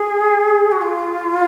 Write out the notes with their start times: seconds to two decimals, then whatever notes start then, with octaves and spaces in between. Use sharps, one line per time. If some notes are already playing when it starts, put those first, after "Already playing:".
Already playing: G#4
0.71 F#4
0.82 F4